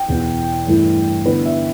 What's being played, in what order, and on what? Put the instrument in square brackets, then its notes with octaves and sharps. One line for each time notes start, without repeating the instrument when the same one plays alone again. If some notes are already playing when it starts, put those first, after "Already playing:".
Already playing: [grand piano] G5
E2 B2 B3 E4
G2 E3 A3 E4
D3 B3 E4 B4
E5